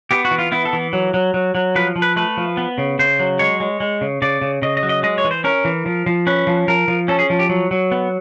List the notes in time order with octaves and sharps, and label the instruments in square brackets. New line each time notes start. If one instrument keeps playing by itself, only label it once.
[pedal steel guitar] B3 G4
F#4
E3
F4
B3 E4
A4
E3
F#3
F#3
F#3
F#3
F3 B4
F3
B4
A3 B4
F3
B3
C#3
C#3 C5
F#3
G#3 C#5
G#3
G#3
C#3
C#3 D5
C#3
C#3 D#5
D#5
F#3
D#5
G#3 D#5
C#5
E3
C5
C#4 A#4
E3
F3
F3
C#4 B4
F3
F3 A#4
F3
C#4 A4
G#4
F3
G4
F#3
F#3
B3